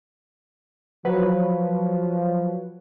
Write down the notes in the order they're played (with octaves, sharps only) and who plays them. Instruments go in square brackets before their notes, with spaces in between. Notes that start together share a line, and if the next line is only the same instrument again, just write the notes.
[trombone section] F3 [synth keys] F#3 B4 C#5